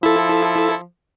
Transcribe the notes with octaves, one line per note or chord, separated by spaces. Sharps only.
F3 E4 A4